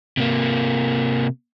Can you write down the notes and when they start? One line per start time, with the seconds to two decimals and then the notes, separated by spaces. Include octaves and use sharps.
0.17 C3 A#3